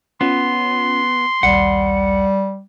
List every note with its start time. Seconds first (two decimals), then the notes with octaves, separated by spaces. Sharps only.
0.21 B3 C#4 F4 C6
1.43 A#1 D#2 G3 F#5